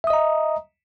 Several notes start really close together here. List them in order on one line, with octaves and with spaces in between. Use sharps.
E5 D#6 D#5 A#5